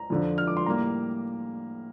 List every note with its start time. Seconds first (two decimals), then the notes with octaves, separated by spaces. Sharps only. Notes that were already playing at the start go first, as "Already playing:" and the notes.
Already playing: A#5
0.10 F2 D3 F3
0.38 F6
0.47 D6
0.57 C6
0.66 A2 G3 A#3 A#5